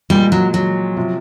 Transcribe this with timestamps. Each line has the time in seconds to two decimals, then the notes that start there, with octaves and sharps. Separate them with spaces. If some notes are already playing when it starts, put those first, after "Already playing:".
0.10 A#2 F3 G3 G#3
0.32 F#3
0.54 F#3
0.97 C3 F3